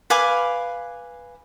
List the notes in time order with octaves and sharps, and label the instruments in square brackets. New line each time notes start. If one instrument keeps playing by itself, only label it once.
[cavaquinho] B4 F5 G#5 D6